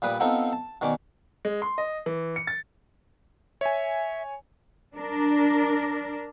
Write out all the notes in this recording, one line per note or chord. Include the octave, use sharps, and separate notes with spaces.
A#2 G3 B4 D#6
B3 C4 D#4 F4 A4
A5
B2 D#3 C#4 D5 D6
G#3
C6
D#5
E3
C#7
A6
C#5 E5 G#5
D4 A#4